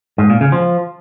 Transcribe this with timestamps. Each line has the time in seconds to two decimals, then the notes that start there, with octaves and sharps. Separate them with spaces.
0.18 G#2
0.30 A#2
0.41 C#3
0.52 F3